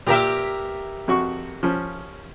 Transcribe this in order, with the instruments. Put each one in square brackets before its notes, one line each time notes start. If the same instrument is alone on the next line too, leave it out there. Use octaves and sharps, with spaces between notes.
[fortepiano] A#2 G5 [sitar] G4 A#4 E5
[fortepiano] F2 F#4 C#6
F3 C#4